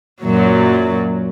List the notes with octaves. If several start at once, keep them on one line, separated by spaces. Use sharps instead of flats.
F#2 A#2 F#3